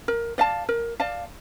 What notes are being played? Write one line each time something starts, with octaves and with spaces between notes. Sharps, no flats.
A#4
D5 F5 A5
A#4
D5 F5 A5